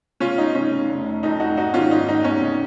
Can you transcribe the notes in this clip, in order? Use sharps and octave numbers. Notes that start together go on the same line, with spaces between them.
C#3 C#4 F4
C#2 D#4
C#3 C#4
C#3
F1
F1
F2 D#4
F1 D#4 F#4
G#2 D#4 F#4
D#3 C#4 F4
G#2 D#4
G#1 D#4
D#2 C#4
C#3